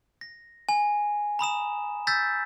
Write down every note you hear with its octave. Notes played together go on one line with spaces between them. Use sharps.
A#6
G#5
A#5 B5 D#6 E7
E6 G6 A6 B6